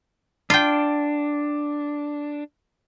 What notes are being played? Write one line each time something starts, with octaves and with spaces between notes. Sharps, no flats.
D4 F4 G5